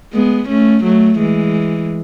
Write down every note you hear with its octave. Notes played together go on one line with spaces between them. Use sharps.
G#3 B3
A3 C#4
F#3 A3
E3 G#3